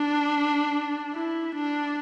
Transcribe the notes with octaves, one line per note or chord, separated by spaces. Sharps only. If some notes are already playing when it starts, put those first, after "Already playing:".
Already playing: D4
E4
D4